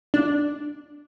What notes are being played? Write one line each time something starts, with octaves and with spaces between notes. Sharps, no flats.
D4